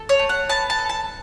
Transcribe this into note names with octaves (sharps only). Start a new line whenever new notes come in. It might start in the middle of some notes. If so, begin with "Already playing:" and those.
Already playing: A4
C#5
A3
F#5
B3 A5
A5
A4
A5